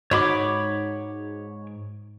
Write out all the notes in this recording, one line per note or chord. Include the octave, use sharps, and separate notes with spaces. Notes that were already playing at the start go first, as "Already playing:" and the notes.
G#2 D#4 F#4 C#5 B5 D6